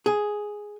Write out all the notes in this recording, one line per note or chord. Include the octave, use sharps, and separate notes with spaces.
G#4